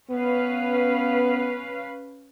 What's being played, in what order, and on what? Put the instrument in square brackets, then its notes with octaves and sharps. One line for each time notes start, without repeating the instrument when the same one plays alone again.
[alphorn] B3 [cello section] C#4 B4 F5